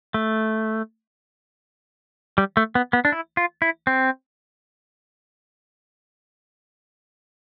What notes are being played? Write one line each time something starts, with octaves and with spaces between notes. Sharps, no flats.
A3
G3
A3
B3
B3
D4
E4
F4
E4
C4